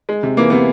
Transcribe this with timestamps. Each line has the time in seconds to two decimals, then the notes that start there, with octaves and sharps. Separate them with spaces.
0.09 G#3
0.23 C3
0.37 E3 A#3
0.50 C3 B3